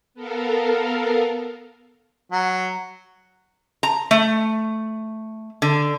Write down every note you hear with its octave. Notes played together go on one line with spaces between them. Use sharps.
B3 A4 A#4 F5
F#3
A#5
A3
D3